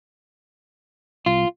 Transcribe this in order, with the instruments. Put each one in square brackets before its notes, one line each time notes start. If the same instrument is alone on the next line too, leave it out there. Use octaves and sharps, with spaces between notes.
[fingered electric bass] C2 [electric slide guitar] F4